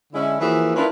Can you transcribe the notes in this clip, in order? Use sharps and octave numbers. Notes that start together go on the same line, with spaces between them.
D3 G#3 C#4 E4
E3 F3 A#3 F#4 G#4 E5
C#4 D4 E4 F4 A#4 B4